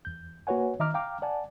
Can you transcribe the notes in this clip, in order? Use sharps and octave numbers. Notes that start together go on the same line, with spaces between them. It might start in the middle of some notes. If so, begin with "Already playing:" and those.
E2 G6
A#3 F#4 B4 C#5 F#5 G#5
D#3 D#5 E5 A#5 D6 F6
F5 G5 A#5 D6 F6
D5 F#5 G#5 A5